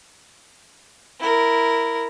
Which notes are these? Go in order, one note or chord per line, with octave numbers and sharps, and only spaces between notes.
E4 A#4